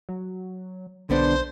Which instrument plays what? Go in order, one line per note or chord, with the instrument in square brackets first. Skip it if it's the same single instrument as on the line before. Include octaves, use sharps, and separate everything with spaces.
[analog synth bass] F#3
[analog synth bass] B1 [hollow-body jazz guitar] D3 B3 D4 [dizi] C5